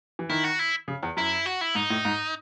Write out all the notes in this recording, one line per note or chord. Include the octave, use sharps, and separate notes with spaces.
E3
D#3 E4
F#4
E4
C#3
E2
F#2 E4
F#4
E4
G#2 D#4
A2
G#2